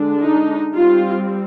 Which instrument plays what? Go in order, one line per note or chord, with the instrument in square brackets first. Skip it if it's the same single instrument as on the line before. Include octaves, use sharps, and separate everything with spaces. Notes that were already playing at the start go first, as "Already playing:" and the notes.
Already playing: [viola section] D3 G#3 D4
D#4
G3 C4 F4